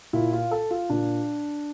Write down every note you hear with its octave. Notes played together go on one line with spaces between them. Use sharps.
A#2 E4
F4
A4
F4
A#2 D4